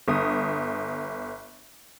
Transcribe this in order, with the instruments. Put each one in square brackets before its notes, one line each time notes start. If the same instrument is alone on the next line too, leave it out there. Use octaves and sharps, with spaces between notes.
[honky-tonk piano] G1 D#6